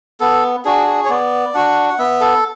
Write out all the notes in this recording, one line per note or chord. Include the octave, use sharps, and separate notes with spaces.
B3 A4
D4 F#4 G#4
G#4
C#5
B3 D5
D4 F#4 F#5
F#5
B3 E5
A4